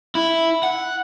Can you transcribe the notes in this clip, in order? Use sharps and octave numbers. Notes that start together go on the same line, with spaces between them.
E4
F#5